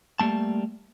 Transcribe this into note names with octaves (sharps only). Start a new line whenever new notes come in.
G3 A3 A#3 A5